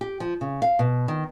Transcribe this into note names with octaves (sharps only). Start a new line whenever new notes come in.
G4
F3
C#3
F5
B2
D#3